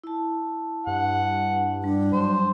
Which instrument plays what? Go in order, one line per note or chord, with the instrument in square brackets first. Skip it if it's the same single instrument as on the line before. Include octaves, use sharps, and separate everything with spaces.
[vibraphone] E4 A5
[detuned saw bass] G2 [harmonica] F#5
[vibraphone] G3 [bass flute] D4
[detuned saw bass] F#3 [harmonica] C5